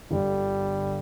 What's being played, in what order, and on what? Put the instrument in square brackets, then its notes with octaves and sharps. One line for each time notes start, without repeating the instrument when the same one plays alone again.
[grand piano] G1 G2 D3 [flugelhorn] G3